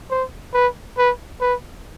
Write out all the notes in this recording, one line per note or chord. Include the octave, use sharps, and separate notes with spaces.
C5
B4
B4
B4